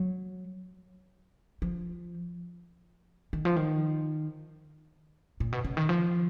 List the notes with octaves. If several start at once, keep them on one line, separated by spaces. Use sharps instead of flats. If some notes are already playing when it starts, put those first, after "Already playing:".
Already playing: F#3
F3
D#3
F3
D#3
A#2
B2
C#3
D#3
F3